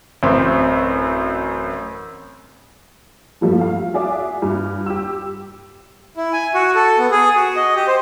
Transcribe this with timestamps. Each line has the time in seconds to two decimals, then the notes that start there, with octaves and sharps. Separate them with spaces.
0.23 A1 F#2 C4
3.41 A#1 G2 F3 G3 A3 F4
3.61 F5
3.94 F#4 G#4 D5 E5 D6
4.42 G2 G3
4.86 G4 E6
6.17 E4
6.33 G#5
6.54 F#4
6.75 A4
6.98 B3
7.11 G#4
7.36 F#4
7.56 D#5
7.76 G4
7.88 C5